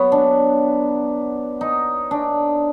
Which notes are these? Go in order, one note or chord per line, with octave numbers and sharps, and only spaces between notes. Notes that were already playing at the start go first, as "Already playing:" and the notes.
Already playing: F#3 B3
D4
D#4
D4